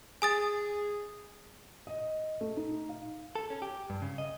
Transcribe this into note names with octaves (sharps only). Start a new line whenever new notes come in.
G#4 G#5 D#6 A6
D#5
A3
D#4
F5
A4
C#4
G4
G2
C#3
D#5